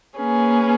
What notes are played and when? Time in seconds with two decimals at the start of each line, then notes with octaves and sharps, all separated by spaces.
0.18 A#3 C#4 G#4 B4